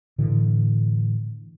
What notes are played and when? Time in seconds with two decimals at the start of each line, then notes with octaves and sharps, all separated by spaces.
0.18 A2 D3 E3